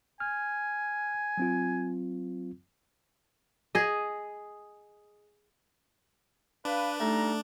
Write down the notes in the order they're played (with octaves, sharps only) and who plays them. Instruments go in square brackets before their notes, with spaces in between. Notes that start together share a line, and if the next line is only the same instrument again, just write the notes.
[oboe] G#5 [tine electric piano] F6
[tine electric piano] F#3 C4 F4
[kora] G#4 D#5
[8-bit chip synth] D4 [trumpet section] B4 [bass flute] F5
[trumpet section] G3 A#5 [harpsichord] A3 [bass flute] D#4